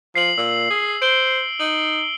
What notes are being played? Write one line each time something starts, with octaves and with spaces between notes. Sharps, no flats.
F3 C7 F#7
A#2 E6
G#4
C5 D7 G7
D#4 F#7